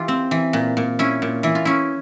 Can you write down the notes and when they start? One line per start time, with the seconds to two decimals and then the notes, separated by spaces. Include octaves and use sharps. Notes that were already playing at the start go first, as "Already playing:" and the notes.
Already playing: E3 F4 G4
0.08 C4
0.31 E3
0.53 A#2
0.77 A#2
0.99 C#4 E4
1.22 A#2
1.43 E3 E4
1.55 F4
1.65 C#4 E4